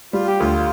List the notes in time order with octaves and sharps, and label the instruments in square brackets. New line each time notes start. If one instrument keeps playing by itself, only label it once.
[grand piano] G3 [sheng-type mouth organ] F4
[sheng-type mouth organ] G4
[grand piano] D2 [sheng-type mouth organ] F4